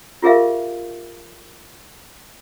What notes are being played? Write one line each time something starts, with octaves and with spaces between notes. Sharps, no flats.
F4 G4 G#4 A#4 E5 F5